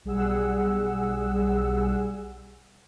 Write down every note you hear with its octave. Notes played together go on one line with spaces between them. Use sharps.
B1 G3 G#4 F#5 E6